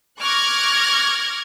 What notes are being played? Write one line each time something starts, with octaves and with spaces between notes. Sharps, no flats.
C#6 D6 F6 F#6 G#6 A#6